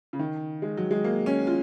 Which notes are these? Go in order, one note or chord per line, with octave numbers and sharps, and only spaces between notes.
C#3
D#3
G#3
F#3
G#3
A#3
C#4
F4